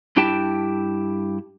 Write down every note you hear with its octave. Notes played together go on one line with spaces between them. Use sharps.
G2 D4 E4 G4 G5 A5